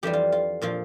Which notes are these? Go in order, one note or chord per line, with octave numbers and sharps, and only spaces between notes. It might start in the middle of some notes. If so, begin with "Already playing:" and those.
F2 E3 G3 G4
F4
F4
A#2 F3 F4